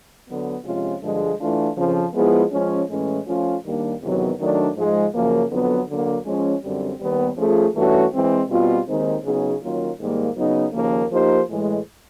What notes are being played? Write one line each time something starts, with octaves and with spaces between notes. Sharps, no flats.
D3 F#3 B3
C3 F3 G#3 C#4 F4
G2 D3 F3 G#3
E3 A3 D4 F4
F2 C#3 F3
F3 G#3 B3 E4 G#4
F3 G#3 C#4
A2 E3 G#3 C#4
F3 A3 C#4 F4
D#2 D#3 G3 A#3 D4
E2 C3 D#3 F#3 B3
D#3 F#3 A3 D4
G#2 F3 G#3
F#2 C#3 F3 A#3
F2 D3 F#3 B3
D3 F#3 A#3
F3 G#3 C#4
F#2 D3 G3 C4
D#2 D#3 G3 B3
F3 A3 C#4 F4 G#4
G2 E3 A3 C#4 F#4
E3 G#3 C4
B2 G3 C4 F4
D#2 D#3 G#3 C4 D#4
C#3 F#3 B3 D#4 G#4
D#3 F#3 A#3 C#4 F4
G#2 D#3 G3 A#3
C#3 F#3 B3 D#4
D#2 C#3 F3 A#3
F3 A#3 D#4 G4 C5
A2 E3 G#3